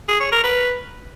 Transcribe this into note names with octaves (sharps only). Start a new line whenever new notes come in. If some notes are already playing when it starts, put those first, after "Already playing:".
G#4
C#5
A#4
B4